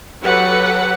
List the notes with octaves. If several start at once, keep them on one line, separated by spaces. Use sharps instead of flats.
F#3 G4 A4 B4 F#5